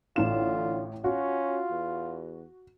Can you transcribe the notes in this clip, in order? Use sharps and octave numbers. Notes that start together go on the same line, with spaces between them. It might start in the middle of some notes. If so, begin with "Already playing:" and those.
A1 A2 D3 F4 E7
C#4 F4 F#4
E2